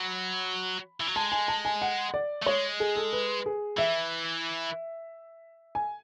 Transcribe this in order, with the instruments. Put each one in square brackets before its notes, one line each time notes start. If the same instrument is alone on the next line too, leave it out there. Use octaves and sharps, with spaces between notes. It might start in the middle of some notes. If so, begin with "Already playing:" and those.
Already playing: [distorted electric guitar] F#3 [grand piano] B5
[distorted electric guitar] E3
F#3
[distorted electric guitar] G#3 [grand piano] A5
[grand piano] G#5
A5
G#5
F#5
D5
[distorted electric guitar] A3
[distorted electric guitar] G#3 [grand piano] C#5
[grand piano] G#4
A4
B4
G#4
[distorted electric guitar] E3 [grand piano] E5
[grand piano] G#5